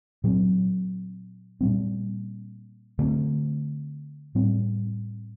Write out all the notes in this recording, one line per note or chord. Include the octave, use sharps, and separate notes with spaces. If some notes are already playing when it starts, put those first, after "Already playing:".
A#2 F#3 C4
A#2 G3 C4
D3 A3 C4
A2 G3 C4